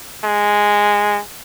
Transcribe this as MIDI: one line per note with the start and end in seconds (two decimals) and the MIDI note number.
0.25 1.21 56